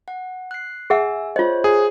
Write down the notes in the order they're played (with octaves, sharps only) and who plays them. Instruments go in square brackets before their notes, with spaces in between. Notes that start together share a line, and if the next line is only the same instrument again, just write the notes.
[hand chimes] F#5
F#6 C7
[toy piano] G#4 E5 F#5 [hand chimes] G#5 E6
[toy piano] F4 D#5 [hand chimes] C5 C#5
[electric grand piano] G#4